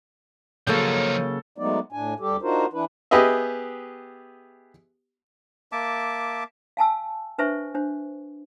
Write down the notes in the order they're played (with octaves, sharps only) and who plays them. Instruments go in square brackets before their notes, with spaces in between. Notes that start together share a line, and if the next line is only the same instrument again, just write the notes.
[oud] C#3 F#3 A#3 [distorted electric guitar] F3 D#4 [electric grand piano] A4 G6
[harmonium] F#3 G#3 A3 B3 D#4 D5
A2 D4 G#5
D2 G3 G4 A4
D4 D#4 F4 F#4 A#4 C5
E3 D4 E4 B4
[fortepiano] B3 G4 G#4 B4 D#5 E5
[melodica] A#3 E5 A5 D6
[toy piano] F5 G#5 A5 E6
D4 B4 C5 E5 G#5 C#6
D4 C5